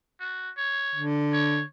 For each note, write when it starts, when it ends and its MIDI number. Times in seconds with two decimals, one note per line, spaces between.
0.20 0.50 66
0.57 1.05 73
0.95 1.62 50
1.33 1.65 73